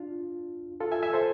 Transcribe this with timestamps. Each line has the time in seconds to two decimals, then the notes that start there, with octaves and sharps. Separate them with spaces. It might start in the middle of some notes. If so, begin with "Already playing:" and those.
Already playing: D4 F4
0.80 F4 A4
0.92 E5 G#5
1.03 E5 G#5
1.13 A4 C5